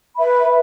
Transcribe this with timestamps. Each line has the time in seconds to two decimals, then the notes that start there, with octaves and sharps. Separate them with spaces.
0.16 B4 E5 B5